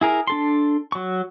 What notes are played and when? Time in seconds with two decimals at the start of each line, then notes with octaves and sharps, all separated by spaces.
0.01 E4 G#4 A#4
0.27 D4 A4 C6
0.92 F#3 C#6